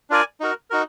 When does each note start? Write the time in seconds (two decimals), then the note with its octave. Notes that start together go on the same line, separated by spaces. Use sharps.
0.10 D4 F4 A#4 D5 G#5
0.40 D#4 F#4 A#4
0.70 D#4 F#4 A#4